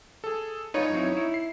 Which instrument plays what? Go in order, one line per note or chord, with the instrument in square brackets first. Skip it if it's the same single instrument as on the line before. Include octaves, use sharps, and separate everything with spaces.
[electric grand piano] G#4 A4
[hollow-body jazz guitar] G2 F4 B4 [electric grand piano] D#4 C#5
[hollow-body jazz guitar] F#2 C4 E4
E4
[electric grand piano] C7